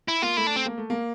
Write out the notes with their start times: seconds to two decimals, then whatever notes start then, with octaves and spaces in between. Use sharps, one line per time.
0.08 E4
0.22 A#3 F4
0.37 A3 E4
0.47 D4
0.56 C4
0.66 A#3
0.78 A3
0.90 A#3